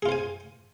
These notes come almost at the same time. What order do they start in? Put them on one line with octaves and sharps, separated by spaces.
G#4 F4 C5 G#5